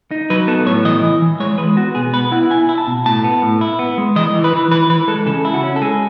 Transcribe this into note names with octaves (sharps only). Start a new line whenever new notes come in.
D#4
F#3 B4
B3 A4
A2 C#5
E3 D#5
E3
E3
G#3 C#5
G#3 B4
B3 F#4
B2 G#4
B3 B4
E4 F#5
E4 G#5
E4
A5
B2
A2 A5
B3
A2
E4
B3
G#3
E3 D#5
E3
B4
E3
E3 B4
E3 B4
G#3 A4
C#3 A4
E4
F#4
C#4
A4
G#3 G#4